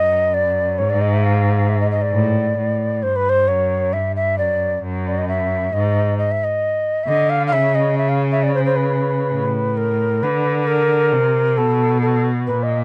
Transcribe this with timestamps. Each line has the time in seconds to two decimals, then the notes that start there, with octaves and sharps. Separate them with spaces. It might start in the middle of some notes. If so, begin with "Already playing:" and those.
Already playing: F#2 D#5
0.34 D5
0.78 G#2 C#5
0.90 D5
1.01 D#5
1.13 E5
1.24 F5
1.69 E5
1.80 D#5
1.91 D#5
2.02 D5
2.14 A2
2.58 A2
3.03 G2 C5
3.16 B4
3.29 C5
3.48 F#2 C#5
3.93 G2 E5
4.16 E5
4.38 F#2 D5
4.83 F#2
5.07 D5
5.18 D#5
5.28 E5
5.73 G#2 D#5
6.18 D#5
6.31 E5
6.44 D#5
7.03 E5
7.07 D3 D#5
7.30 F5
7.47 F5
7.52 C#3 E5
7.75 D#5
7.98 E5
8.09 F5
8.32 E5
8.43 D5
8.54 C5
8.65 C5
8.76 B4
9.33 A2
9.77 A#4
10.22 D3 B4
10.67 A#4
11.13 C3
11.57 B2 A4
12.02 A4
12.47 A#2 B4
12.63 D#5